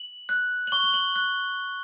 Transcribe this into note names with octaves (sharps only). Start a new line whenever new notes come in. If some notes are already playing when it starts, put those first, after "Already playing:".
Already playing: F#7
F#6
F#7
C#6 G7
G7
F#7
F#6